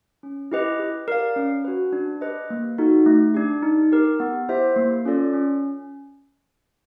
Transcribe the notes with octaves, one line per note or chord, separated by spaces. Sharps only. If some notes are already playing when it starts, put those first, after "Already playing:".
C#4
E4 G4 B4 D#5
G4
A#4 D5 F5
C#4
F#4 B4
D4
G4 B4 D#5
A#3
D#4 F#4 A4
A3
D4 G4
D#4
G4 A#4
B3
E4 G4 C5 E5
A#3
C#4 F4 A4 D5
C#4